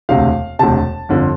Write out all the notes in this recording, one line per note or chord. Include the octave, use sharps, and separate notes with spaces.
E1 D2 C3 F5
E1 D2 C3 A5
G1 F2 D3 F3